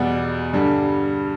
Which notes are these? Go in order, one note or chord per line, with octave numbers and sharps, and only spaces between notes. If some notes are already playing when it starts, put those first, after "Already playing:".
Already playing: E2 B2 G3 D5 F#5
G2 D3 G3